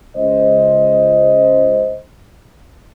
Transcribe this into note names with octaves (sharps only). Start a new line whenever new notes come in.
C#2 C5 D#5